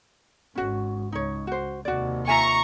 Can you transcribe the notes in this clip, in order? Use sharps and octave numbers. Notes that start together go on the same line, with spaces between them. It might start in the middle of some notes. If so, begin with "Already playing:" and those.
G#1 G#2 C#4 F#4
C#2 D#4 C#5
F#4 C5
D#2 C3 F#4 D5
F4 E5 G#5 A#5 C#6